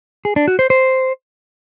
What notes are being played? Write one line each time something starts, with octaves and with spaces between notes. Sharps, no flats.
G#4
D4
F#4
C5
C5